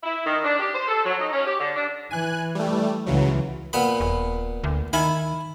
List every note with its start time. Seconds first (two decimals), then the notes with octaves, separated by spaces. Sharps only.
0.04 E4
0.26 D#3
0.44 D4
0.59 G4
0.74 C5
0.88 A4
1.05 F#3
1.19 D#4
1.33 C#4
1.47 G4
1.59 D3
1.76 D4
2.11 E3 G#5 F#6
2.55 G3 A3
3.07 C#2 C#3 E3 F#3
3.73 A#2 B3 B5
4.00 D#1
4.64 D2
4.93 D#3 E4 G#5 B5